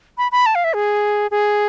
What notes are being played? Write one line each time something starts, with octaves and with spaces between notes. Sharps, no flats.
B5
B5
A5
F5
E5
G#4
G#4